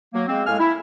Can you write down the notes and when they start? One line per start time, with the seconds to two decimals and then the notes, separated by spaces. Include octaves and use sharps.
0.14 F#3 A#3
0.28 G#3 A#3 C4
0.47 A2 G#3 F5 G#5 F6
0.60 E4